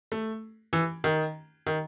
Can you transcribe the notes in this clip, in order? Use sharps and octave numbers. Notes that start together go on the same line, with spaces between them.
A3
E3
D#3
D#3